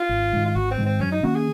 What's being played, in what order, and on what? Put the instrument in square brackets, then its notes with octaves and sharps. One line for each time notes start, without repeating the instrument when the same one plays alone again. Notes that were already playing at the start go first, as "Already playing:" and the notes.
Already playing: [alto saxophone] F4
[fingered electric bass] G#1
G#2 D#3
[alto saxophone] F4
[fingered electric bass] G#1 [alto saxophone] F#4
[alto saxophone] C4
[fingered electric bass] G#2 D#3
[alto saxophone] C4
[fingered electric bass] F#2 [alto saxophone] C#4
[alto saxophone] D#4
[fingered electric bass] D#3 A#3 C#4 [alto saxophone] F#4
[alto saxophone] G#4